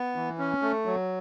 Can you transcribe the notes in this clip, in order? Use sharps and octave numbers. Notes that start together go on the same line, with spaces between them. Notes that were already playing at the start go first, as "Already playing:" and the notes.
Already playing: B3
E3
C#4
A3
F#3